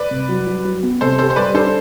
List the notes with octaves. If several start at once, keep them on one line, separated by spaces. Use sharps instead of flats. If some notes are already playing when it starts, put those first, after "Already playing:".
Already playing: B4 D5
C3
F#3
F#3
F#3
B3
C3 A4 C5
G4 A4 C5
C5
G3 B4 D5
D4 A4 C5